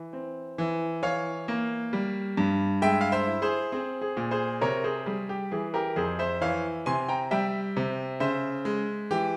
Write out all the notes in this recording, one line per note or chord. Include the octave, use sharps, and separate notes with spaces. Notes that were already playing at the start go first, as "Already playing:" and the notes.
Already playing: E3
C4
E3
E3 C#5 F5
A#3
G3
G2
G#3 E5 G5
F5
C5 E5
E4
G#4 C5
C4 G#4
G#4
A#2
G#4 C5
C3 A#4 C#5
G#4 C5
G3 G#4
G4
E3 G#4
G4 A#4
F2 G#4 C5
C5 E5
E3 C#5 F5
C3 G#5 C6
G5 A#5
G3 E5 G5
C3
C#3 C5 E5
G#3
E3 G4